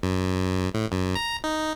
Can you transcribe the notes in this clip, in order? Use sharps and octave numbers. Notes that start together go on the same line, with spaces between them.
F#2
A2
F#2
A#5
D#4